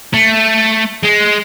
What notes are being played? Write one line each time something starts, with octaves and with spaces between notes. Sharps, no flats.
A3
G#3